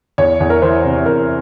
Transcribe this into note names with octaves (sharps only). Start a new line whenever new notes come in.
E2 C#5
E2
A#4
E3 C5
C3
E2 A#4